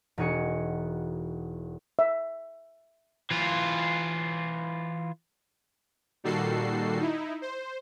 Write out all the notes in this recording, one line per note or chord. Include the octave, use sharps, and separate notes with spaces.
E1 D#4 F#4 G#4 C#7
E5
E3 F4
A#2 D#3 G3 F#4 A4 C7
D#4 E4
C5